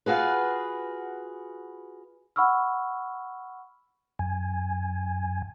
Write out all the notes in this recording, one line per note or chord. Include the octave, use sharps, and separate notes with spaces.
F4 F#4 G#4 B4
F#5 B5 C#6 E6 F6
F#2 G#5